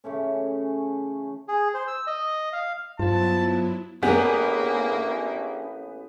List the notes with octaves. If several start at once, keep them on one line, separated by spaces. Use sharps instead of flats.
C#3 E3 A3 C#4
G#4
C5
E6
D#5
F5
G2 F#3 B3 E4 F4 C5 A5
A1 A#3 B3 D4 G4 G#4 A#4